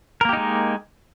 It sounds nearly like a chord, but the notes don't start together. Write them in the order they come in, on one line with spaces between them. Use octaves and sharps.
A#4 A#3 G4 D#4 G#3